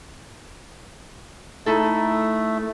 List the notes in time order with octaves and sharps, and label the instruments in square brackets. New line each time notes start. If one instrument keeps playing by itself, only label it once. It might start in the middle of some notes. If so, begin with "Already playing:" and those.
[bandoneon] A3 [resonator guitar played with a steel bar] D#4 E4 A4